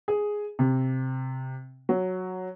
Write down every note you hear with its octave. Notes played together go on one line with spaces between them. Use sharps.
G#4
C3
F#3